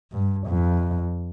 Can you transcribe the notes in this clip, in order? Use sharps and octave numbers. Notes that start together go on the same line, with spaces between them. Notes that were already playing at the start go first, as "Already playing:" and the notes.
G2
F2